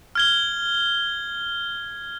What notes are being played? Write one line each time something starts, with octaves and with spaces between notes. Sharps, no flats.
F6 G#6 G7